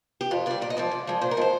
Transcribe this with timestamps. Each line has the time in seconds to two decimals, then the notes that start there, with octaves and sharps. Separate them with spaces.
0.21 G4
0.31 F2 F4
0.46 D3 G3 D5
0.62 A#2 D5
0.70 D#5
0.77 F3 G#3 D5
0.91 G#2
1.07 F3 G#3
1.21 A#2 C5
1.31 A#4
1.37 F3 G#3 C5